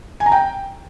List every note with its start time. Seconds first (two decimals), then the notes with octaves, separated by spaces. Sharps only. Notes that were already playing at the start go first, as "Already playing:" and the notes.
0.20 G#5
0.26 A#5
0.32 G5